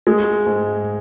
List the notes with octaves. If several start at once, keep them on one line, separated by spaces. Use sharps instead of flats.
G#3
G#2